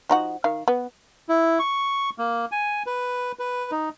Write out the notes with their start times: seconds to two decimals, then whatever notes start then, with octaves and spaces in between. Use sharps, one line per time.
0.09 F3 D#4 F#4
0.44 D#3 F5
0.68 B3
1.29 E4
1.59 C#6
2.18 A#3
2.52 G#5
2.87 B4
3.39 B4
3.71 D#4